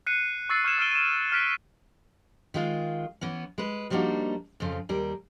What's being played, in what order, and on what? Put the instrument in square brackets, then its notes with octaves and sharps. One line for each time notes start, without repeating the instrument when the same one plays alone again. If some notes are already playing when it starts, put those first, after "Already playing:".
[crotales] F#6 C7 C#7 D#7
C#6 E6 A6 C7 C#7
C#6 F6 G#6 C#7 D#7 E7
E6 F6 C7 D7 D#7 G7
D#7 E7
F6 F#6 B6 D7 E7
[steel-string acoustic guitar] D#3 G#3 F4
E3 B3 C#4
G#3 B4
F3 G3 A#3 D4 D#4 F#4
F2 C#3 F3
D#2 G3 A#4